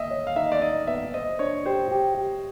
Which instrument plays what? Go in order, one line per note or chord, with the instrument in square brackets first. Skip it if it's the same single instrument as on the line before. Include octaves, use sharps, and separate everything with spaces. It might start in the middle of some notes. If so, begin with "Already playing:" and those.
Already playing: [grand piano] D#5 E5
[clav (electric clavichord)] C#5
[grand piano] F5
[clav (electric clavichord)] D#4 [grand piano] E5
[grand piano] D5
[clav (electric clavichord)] D#4 [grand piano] D#5
[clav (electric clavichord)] B3 [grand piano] E5
[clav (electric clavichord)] C5 [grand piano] D#5
[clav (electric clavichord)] D4 [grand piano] C#5
[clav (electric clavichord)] G4 [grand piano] C5
[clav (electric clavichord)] G4
G4